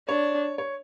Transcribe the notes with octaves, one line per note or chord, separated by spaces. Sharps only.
D4 C#5
C#5